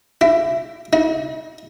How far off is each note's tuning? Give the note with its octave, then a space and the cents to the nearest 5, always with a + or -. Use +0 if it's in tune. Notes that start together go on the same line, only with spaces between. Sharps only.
E4 +20
E4 -45